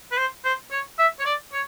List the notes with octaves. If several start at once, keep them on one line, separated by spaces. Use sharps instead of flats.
B4
C5
C5
C#5
E5
C#5
D5
C#5